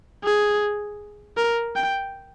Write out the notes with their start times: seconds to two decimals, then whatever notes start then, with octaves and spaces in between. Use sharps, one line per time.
0.24 G#4
1.37 A#4
1.76 G5